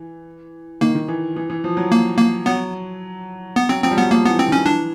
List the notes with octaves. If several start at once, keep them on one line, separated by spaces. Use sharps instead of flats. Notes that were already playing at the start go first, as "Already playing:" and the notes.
Already playing: E3
D#3 A#3
D#3
E3
E3
E3
F3
F#3
A#3
A#3
F#3 B3
B3
F#3 C4
F3 C4
G3
F#3 B3
F3 A#3
E3 B3
C4
D#3 C#4
E3 D4